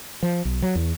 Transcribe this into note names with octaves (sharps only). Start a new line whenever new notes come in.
F3
B1
F#3
E2